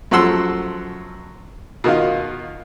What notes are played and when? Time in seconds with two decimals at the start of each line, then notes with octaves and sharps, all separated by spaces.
0.11 F#2 F3 A3 F#5 C6 E6
1.84 B2 D#3 D#4 F4